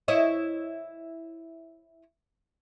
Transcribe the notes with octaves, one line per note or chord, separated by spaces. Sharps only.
E4 C#5 D#5